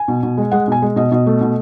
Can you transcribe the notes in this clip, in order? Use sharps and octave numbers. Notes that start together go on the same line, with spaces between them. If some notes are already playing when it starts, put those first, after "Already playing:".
Already playing: G#5
B2
B2
G#3
G#3 F#5
B2 G#5
G#3
B2 D#5
B2 D#5
A3
B2